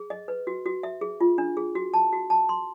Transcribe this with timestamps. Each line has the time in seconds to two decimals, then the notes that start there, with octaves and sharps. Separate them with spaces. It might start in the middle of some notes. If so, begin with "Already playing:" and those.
Already playing: G#4
0.10 D#5
0.28 B4
0.47 F#4
0.66 F#4
0.83 E5
1.01 G#4
1.21 F4
1.38 D4
1.57 G#4
1.75 F#4
1.94 A5
2.12 F#4
2.30 A5
2.49 C6